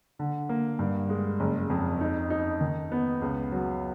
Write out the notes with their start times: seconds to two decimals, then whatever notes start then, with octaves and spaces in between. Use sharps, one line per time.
0.19 D3
0.49 A#3
0.79 G2
1.09 G#3
1.40 F#1
1.70 F2
2.01 D#4
2.30 D#4
2.61 D#3
2.92 B3
3.22 C#2
3.52 F#3